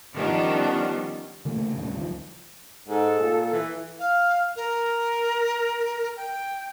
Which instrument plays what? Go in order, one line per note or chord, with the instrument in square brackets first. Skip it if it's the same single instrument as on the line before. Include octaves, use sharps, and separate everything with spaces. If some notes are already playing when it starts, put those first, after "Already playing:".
[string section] D#3 F3 G3 B3 C#4 D4
[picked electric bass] C#3 E3 A3 A#3
D#2 A2 C#3
G2
C#2 D#3 F3
[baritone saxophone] G#2 [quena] A4
[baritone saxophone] A#2
E3
[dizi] F5
A#4
G5